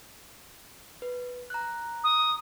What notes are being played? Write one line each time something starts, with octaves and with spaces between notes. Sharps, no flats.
B4
A#5 F#6
D#6